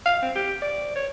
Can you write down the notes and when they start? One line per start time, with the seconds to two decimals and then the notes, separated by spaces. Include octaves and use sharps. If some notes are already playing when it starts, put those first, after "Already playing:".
0.06 F5
0.22 C4
0.35 G4
0.62 D5
0.95 C#5